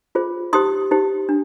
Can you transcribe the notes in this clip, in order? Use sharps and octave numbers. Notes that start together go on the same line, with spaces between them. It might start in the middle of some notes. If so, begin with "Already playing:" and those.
F4 G#4 C5
D#4 G4 C5 C6 D#6
D#4 G4 C5
D4